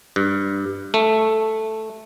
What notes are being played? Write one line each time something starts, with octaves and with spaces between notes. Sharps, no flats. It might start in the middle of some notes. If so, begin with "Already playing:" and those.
G2
A3